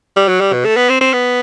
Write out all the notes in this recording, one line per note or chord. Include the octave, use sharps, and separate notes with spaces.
G3
F#3
G3
B2
A3
B3
C4
C4
B3